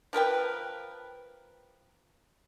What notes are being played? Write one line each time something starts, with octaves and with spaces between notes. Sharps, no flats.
F3 A#4 B4 G5